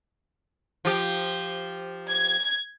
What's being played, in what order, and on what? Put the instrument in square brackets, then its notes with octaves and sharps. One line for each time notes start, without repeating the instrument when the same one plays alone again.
[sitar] F3 G4
[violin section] G#6